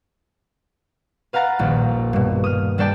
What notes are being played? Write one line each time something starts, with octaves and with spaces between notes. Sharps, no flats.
B4 F5 F#5 A#5 A6
D#1 A#1
G2 B2
D#6 F6
G3 D4 A4 D5 G5 A5